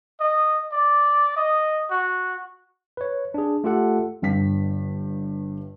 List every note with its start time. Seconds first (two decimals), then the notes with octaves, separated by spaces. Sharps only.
0.20 D#5
0.72 D5
1.37 D#5
1.91 F#4
2.97 B4 C#5
3.34 D4 G#4
3.64 A3 F4 G4 A4 F#5
4.22 G1 G2 G5 B6